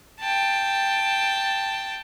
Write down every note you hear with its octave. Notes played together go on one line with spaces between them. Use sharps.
G5 A5